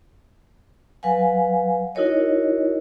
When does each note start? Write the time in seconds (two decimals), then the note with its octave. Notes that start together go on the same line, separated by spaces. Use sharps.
1.03 F#3 B4 F5 F#5 G#5
1.95 D#4 E4 F#4 A#4 C#5 D#5